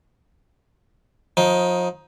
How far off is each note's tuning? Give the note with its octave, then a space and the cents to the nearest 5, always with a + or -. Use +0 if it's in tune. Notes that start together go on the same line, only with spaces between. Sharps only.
F3 +35 D#4 +15